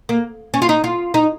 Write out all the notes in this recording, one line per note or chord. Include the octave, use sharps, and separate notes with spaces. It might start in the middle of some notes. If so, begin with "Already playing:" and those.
A#3
C#4
F4
D#4
F4
D#4